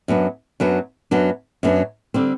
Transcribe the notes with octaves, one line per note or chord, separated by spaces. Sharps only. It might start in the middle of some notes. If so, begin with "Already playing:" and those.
F#2 F#3 B3 D4
F#2 F#3 B3 D4
F#2 F#3 B3 D4
F#2 F#3 B3 D4
D3 G3 C4